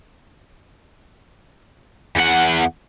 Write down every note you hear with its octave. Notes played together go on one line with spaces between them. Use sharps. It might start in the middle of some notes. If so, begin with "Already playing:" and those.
E2 F#5